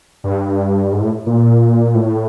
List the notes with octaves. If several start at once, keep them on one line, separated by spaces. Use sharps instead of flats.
G2
G#2
A2
A#2
A2